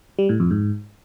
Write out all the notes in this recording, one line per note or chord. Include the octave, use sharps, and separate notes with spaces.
G3
A2
F2
G#2